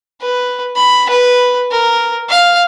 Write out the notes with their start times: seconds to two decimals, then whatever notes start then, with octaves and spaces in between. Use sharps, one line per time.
0.22 B4
0.76 B5
1.09 B4
1.71 A#4
2.29 F5